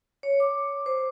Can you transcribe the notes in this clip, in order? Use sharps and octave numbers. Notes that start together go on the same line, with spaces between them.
C#5
D6
C5